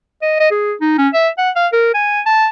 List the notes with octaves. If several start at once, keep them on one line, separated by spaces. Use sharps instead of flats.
D#5
D#5
G#4
D#4
C#4
E5
F#5
F5
A#4
G#5
A5